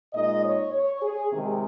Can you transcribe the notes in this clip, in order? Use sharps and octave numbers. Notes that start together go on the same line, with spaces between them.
A#2 G#3 D#4 D#5
C#5
C#5
G#4
C3 D#3 G#3